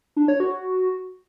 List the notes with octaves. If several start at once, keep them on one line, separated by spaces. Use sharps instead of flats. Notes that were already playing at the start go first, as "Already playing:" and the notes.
D4
C#5
F#4